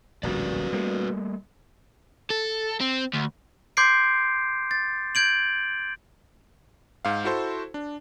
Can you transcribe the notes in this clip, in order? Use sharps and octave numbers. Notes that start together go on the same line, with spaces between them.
D1 A#1 G3 F#4 B4 D5
G3 A3 A#3
A4
C4
D2
C6 D6 G6 G#6 C7 D7
A6
G6 G#6 D7 F#7
G#2 F5
E4 F#4 A4 C5
D4